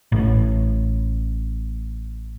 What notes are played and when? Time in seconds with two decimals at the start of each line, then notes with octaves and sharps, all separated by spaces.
0.12 A1 A2